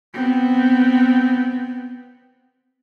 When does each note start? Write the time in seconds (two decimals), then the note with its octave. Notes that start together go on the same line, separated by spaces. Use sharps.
0.14 B3 C4